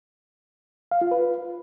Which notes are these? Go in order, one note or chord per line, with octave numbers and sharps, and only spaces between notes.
F5
F4
B4